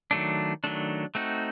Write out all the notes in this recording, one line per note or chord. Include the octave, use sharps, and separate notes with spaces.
D#3 F#3 A3 D4
D#3 F#3 A3 D4
A3 C4 D#4 F#4